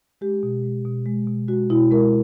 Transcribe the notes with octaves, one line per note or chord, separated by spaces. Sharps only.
G#3 G4
B2
G#3
B2
G#3
B2
G#3 F#4
B2 E4
G#3 A#4